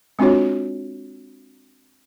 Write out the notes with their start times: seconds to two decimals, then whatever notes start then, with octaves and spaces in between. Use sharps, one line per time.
0.19 G#3 C4 D4 F4 F#4 C#5